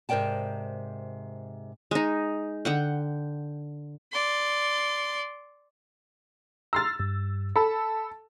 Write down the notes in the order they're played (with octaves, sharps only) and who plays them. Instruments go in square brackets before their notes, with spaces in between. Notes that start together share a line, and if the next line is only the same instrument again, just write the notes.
[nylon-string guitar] G#2 C3 A#4 D5 G5 A5
[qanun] G#3 D#4
D3 F#5 G5
[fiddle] D5 C6
[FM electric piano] A#5 C6 F6 [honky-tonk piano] E6 A6
[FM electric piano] G2
[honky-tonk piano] A4 [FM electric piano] B5 E6